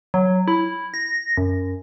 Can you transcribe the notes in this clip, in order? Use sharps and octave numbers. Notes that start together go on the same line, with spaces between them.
F#3
E4
A#6
F#2